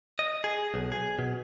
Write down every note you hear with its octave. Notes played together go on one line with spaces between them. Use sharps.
D#5
G#4
B1
G#4
B2